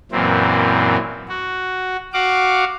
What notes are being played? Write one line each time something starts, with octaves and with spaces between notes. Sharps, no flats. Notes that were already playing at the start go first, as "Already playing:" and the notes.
F#2 A#2 E3 C4
F#4
F#4 F5 F#5 D6